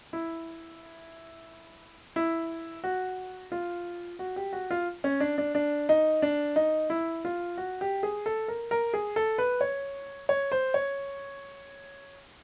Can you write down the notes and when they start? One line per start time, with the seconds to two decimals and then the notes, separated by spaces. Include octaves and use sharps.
0.13 E4
2.16 E4
2.84 F#4
3.52 F4
4.19 F#4
4.36 G4
4.53 F#4
4.71 F4
5.04 C#4
5.20 D4
5.38 D4
5.55 D4
5.89 D#4
6.22 D4
6.56 D#4
6.90 E4
7.25 F4
7.57 F#4
7.81 G4
8.03 G#4
8.26 A4
8.48 A#4
8.71 A#4
8.94 G#4
9.16 A4
9.38 B4
9.61 C#5
10.29 C#5
10.52 C5
10.74 C#5